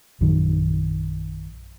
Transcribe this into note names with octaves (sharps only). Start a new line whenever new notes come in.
A#1 F#2 D#3